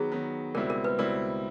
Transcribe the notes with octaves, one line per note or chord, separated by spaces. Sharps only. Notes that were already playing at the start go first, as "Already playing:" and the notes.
Already playing: D#3 F#3 B3 G#4
D#3 F#3 B3
C#2 B2 G3 C4 E4 A#4
A#4
B4
C#2 B2 G3 C4 E4 A#4